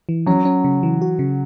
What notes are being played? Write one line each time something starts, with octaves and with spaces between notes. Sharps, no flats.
E3
F#3 C#4
C#4
C#3
E3
F#4
C#3